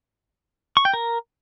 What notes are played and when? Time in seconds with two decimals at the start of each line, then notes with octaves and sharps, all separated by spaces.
0.77 C#6
0.85 G5
0.94 A#4